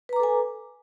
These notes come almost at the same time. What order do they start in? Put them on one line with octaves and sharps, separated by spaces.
B4 A#5 D6 A4 G#5